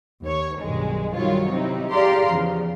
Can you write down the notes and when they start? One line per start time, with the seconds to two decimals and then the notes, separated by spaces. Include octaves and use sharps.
0.24 D#2 C#5
0.61 B1 G2 D#3 G#3
1.15 D#3 F#3 G3 F4 F#4 C#5
1.49 C3 C4 D#4 E4
1.92 G4 G#4 D5 F5 A#5 C6
2.29 E2 C#3 F3